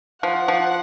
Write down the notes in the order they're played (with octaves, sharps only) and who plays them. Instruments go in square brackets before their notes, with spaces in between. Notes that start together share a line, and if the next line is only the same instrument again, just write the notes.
[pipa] F3 [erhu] F#5
[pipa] F3